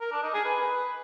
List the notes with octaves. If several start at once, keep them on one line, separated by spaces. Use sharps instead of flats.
A#4
D4
D#4
G#4
B4